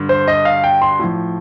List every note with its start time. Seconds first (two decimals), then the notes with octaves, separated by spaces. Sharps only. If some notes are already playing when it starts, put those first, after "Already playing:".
Already playing: G2 D3
0.09 C5
0.28 D#5
0.45 F5
0.64 G5
0.82 C6
0.99 A2 F3